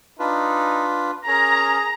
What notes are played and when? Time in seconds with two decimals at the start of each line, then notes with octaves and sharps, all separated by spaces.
0.19 D4 D#4 F4 B4
1.27 C#4 G#4 A#4 C#5 A#5